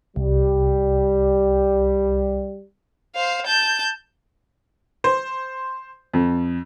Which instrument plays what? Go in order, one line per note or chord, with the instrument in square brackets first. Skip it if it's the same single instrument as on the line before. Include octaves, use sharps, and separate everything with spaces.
[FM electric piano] C2 [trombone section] G3
[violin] C5 F5
A5 G6
[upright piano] C5
F2